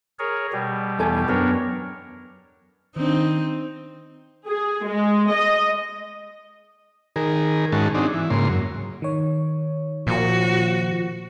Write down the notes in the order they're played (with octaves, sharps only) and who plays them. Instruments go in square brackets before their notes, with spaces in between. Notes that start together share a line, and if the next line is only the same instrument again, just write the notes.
[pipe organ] G#4 A#4 C#5
B2 G3 G4
[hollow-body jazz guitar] E2 A4 G#5
[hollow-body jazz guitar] F#2 B3 [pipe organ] D4 A#4 C#5
[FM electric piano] D#3 D4 [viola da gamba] C4 D#4
[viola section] G#4
G#3
D#5
[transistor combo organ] D#3 G#4 A#4
G#2 D#3 G#3 C#4 F#4 A5
C4 D4 D#4 F#4 G#4
E3
G#2 C#3 A#3 C6
F#2
[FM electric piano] D#3 C#5
[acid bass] A#2 [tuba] F3 [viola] F#4